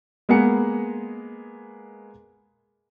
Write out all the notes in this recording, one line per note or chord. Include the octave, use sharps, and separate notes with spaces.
G#3 A#3 B3 G#4 C#7